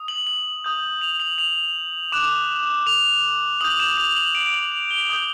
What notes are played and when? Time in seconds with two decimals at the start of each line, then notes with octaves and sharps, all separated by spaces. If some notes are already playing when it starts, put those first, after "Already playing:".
Already playing: D#6
0.08 F#7
0.27 F#7
0.64 D#6 G6
1.01 F7
1.20 F#7
1.38 F7
2.12 D6 F#6 E7
2.87 F7
3.61 D#6 G6 F#7
3.80 E7
3.97 F7
4.17 F#7
4.35 D7
4.54 F#7
4.72 F7
4.91 G7
5.10 D#6 G6